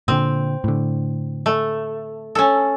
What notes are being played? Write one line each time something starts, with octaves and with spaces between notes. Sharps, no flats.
A#2 D3 C4
A2 D3
A3
C#4 A4